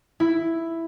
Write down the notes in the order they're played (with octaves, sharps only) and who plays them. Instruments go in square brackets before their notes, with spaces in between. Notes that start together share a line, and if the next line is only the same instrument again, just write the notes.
[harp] E4